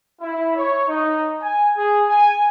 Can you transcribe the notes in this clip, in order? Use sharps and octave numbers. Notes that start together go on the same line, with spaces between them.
E4
C#5
D#4
G#5
G#4
G#5